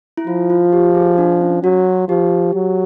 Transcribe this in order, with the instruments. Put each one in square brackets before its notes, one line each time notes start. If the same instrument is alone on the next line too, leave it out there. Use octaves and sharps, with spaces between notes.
[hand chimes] E4
[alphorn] F3 [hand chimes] F4
[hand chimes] F4
G4
G#4
D4
C#4
[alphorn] F#3 [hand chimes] F#4
[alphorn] F3 [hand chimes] G4
[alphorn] F#3